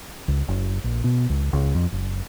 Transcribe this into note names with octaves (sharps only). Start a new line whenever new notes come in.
C#2
F#1
A#1
B2
C#2
C#2
F2
F#1